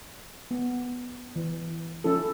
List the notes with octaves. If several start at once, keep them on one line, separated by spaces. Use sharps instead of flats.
B3
E3
F3 C#4 E4 A4